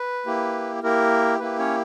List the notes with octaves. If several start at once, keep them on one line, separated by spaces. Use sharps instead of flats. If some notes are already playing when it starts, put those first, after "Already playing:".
Already playing: B4
A#3 E4 G4
A#3 E4 G4 A#4
A#3 E4 G4 B4
C#4 C#5